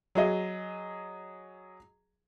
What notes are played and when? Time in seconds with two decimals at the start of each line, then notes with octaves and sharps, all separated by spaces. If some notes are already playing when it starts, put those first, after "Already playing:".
0.15 F#3 G#4 D#5